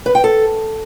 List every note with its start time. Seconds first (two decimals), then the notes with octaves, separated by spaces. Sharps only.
0.06 B4
0.15 G5
0.24 A4